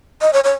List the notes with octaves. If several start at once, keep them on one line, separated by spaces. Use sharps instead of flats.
D#5
C#5
C#5